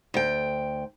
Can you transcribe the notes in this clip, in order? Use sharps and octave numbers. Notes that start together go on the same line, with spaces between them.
D2 G5